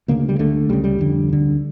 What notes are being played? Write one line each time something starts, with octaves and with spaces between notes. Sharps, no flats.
D2 C#3 A#3
G3
D2 D3 A3
C#2 C#3 G3
G3
F2 D3
D2 D3